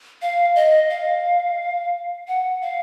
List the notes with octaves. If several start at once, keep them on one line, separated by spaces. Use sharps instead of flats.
F5
D#5
F5
F#5
F5